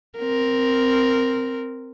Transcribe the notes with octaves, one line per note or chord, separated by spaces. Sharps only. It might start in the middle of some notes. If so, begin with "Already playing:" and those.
C4 A#4